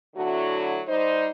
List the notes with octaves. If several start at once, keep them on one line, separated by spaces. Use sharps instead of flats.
D3 F#3 A3 E4 F#4 C#5
G3 D#4 C5